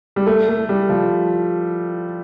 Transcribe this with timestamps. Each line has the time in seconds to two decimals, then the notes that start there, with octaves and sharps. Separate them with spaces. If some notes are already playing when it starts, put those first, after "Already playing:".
0.16 G3
0.27 A3
0.48 A3
0.69 G3
0.89 F3